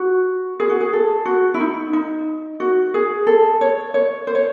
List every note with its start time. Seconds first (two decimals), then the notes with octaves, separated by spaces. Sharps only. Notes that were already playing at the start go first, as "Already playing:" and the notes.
Already playing: F#4
0.60 G#4
0.69 F#4
0.80 G#4
0.93 A4
1.25 F#4
1.54 E4
1.60 D#4
1.93 D#4
2.60 F#4
2.94 G#4
3.27 A4
3.61 C#5
3.94 C#5
4.27 C5
4.35 C#5